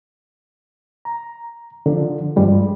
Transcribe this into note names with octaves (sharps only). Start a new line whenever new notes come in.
A#5
D3 F3
G2 F3 G3 G#3